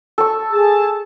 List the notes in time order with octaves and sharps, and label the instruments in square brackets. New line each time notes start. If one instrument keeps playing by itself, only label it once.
[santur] A4 C#6
[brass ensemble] G#4 A5